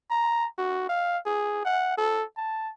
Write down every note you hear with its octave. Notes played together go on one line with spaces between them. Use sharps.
A#5
F#4
F5
G#4
F#5
A4
A5